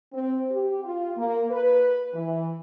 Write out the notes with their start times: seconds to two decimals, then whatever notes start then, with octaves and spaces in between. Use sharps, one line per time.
0.13 C4
0.50 G4
0.84 F4
1.17 A#3
1.51 B4
2.14 E3